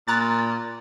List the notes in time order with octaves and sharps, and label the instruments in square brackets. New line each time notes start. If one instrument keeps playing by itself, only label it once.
[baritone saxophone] A#2 [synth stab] A#5 F#6 A6